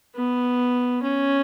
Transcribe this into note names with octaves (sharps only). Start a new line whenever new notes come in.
B3
C#4